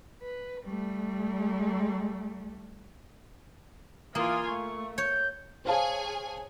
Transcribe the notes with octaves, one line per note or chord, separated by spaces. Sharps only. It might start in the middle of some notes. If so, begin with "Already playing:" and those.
B4
G3 A3
E3 A#3 F4 G#5 D#6
A3 C#6
C#5 G6
G#4 C5 C#5 F5 G#5 A5